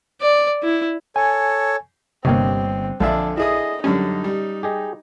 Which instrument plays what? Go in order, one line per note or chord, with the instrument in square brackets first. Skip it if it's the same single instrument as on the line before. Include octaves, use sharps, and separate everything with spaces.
[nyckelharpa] D5
E4
[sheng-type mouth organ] A4 C#5 [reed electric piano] G#5
[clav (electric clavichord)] G1 C#5 D#5 [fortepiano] G2 [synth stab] C3 G3 A#3 [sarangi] C4
[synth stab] A#1 [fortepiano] F2 D3 E5 [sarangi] D4 [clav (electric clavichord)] A4 F5 G#5
[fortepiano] E4 G#4 D#6 [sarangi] D#5
[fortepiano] F#2 D3 G3 [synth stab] C#4 [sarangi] D#4
[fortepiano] G3
[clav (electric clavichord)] G4 G#4 D#5